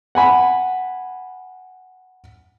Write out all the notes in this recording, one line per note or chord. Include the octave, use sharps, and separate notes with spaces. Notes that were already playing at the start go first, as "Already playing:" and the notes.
F#5 G#5 B5